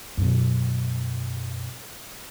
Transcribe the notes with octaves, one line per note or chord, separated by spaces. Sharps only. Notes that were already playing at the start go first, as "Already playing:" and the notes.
F#2 B2